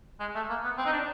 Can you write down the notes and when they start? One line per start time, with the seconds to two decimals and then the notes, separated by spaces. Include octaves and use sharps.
0.20 G#3
0.35 A3
0.50 A#3
0.64 B3
0.78 C4
0.86 D#4
0.93 D4